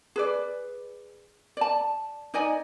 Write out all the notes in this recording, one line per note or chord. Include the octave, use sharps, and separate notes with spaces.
G#4 B4 D5
D5 A5
D#4 D5 D#5 G#5